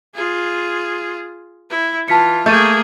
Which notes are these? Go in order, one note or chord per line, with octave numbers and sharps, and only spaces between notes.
F4 G#4
E4
E3 F4 A5 B6 C#7
A3 A#3 G#4 G6 A6 D#7